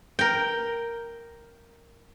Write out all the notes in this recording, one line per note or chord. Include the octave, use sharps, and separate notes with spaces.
A#4 G5